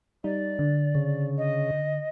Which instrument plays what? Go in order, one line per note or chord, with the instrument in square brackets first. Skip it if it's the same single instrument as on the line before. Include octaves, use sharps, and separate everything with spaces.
[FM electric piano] G3 D#4 [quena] D5
[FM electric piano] D3
[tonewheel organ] C#3
[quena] D#5